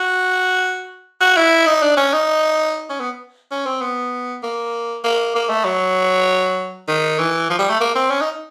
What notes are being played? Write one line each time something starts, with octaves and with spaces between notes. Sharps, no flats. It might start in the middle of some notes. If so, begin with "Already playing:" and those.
Already playing: F#4
F#4
E4
D#4
D4
C#4
D#4
C#4
B3
C#4
C4
B3
A#3
A#3
A#3
A3
F#3
D#3
E3
F3
G3
A3
A#3
C4
C#4
D#4